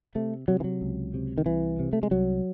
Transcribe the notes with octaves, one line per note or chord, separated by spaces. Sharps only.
C3 A3
C3 F#3
E3
F#3
C#2
C3
D#3
C2 E3
C3
A3
G#3
C2 F#3